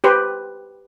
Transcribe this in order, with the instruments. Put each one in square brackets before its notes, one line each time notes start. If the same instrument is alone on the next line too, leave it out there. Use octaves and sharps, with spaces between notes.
[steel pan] G4 B4 C5